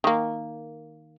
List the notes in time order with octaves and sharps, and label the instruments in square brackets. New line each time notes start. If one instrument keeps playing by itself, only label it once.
[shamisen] D#3 A#3